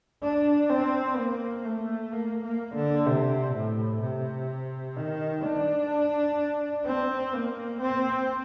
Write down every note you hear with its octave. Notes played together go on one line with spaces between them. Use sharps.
D4
C4
A#3
A3
A#3
A#3
D3
C3
A2
C3
D#3
D4
C4
A#3
C4